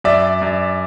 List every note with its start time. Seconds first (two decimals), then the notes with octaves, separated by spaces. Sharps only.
0.04 F#2 D5 E5
0.42 F#2